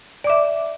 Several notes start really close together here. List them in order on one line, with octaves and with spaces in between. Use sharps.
D5 D6 E5